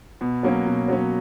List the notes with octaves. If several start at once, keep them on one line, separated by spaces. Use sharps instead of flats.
B2
F#3 A#3 C#4
B2
F#3 A#3 C#4